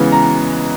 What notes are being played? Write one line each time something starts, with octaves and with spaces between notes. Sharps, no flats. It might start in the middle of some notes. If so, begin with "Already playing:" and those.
Already playing: C#3 E3 G#3 B3
A#5